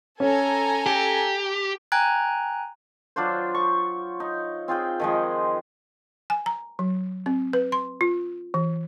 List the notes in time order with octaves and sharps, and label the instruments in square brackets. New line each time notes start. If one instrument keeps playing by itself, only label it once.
[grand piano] C#4 [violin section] A4 G#5 A#5
[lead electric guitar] G4
[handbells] G5 G#5 A#5 F#6 G#6
[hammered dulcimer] F#3 D4 F4 C5
C#6
D#4
C4 F4 G#4 G5
D#3 F3 G#3
[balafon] G#5
A#5
F#3
C4
B4
C6
F4
E3